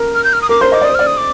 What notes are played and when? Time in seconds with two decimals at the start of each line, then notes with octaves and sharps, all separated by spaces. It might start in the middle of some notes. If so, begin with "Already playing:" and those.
Already playing: A#4
0.15 F6
0.24 G6
0.33 F6
0.42 D#6
0.49 A#4 D6
0.61 C5 C6
0.72 D#5 D6
0.81 D5 D#6
0.89 C5
0.95 D5 F6
1.07 D#6
1.17 D6